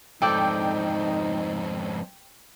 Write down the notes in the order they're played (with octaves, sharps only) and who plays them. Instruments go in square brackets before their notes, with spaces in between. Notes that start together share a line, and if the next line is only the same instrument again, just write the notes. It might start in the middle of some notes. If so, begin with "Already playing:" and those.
[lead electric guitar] F2 G#2 [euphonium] D#4 [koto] A4 D5 [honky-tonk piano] G5